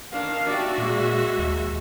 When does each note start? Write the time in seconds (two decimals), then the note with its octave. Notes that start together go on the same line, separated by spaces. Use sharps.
0.12 D#3 D4 F5
0.47 D4 F#4 G4 D5 E5
0.78 A#2 G#3
1.39 D#2